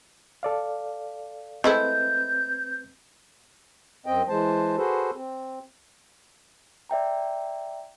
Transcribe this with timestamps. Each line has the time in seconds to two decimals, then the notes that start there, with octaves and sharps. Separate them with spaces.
0.43 A4 D5 F5
1.64 G#3 A3 C4 E4 B4 G6
4.06 F#2 C4 D#5 G5
4.28 E3 G#3 C5 A5
4.77 F#4 G#4 A4 B4 C5
5.14 C4
6.90 D5 E5 G5 A#5